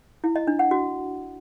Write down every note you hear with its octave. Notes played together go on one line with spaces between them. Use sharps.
E4
D#5
D4
F#5
F#4